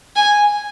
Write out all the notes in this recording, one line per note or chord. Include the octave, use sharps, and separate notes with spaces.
G#5